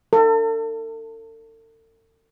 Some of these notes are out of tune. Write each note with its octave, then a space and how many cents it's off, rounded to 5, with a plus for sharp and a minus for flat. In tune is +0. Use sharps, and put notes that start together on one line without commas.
A4 +40